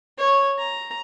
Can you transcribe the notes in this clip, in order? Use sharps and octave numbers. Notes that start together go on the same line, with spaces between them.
C#5
A#5